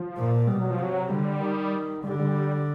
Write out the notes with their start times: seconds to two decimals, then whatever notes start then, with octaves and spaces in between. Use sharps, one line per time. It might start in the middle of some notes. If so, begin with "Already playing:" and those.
Already playing: F3
0.17 A#2
0.47 B2 G3
0.60 F#3
0.70 F3
0.79 C3 F#3
1.10 D3 G3
1.41 D#3
2.04 D3 G3
2.19 G3